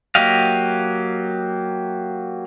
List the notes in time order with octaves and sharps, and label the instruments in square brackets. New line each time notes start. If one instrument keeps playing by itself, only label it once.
[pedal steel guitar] F#3 A#3 G4 D#5 F5